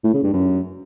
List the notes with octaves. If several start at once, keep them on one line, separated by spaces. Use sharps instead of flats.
A2
C#3
G2
F#2